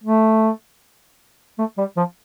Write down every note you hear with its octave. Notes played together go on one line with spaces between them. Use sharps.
A3
A3
G3
F3